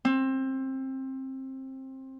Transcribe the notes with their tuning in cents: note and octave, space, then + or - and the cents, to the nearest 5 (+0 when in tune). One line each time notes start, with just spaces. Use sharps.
C4 +20